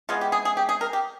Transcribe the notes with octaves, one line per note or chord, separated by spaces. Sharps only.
E3 G#3 B3 F4
G4
G#4
G#4
G4
G#4
A#4
G4